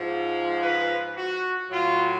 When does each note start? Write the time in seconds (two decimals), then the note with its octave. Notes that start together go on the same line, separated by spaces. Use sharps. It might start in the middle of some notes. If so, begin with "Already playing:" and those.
Already playing: G#2 F3
0.61 B4
1.16 F#4
1.70 A2 F#3 F4